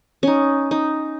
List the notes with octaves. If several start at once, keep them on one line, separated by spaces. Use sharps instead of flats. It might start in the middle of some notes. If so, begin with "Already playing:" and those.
C#4 D#4
D#4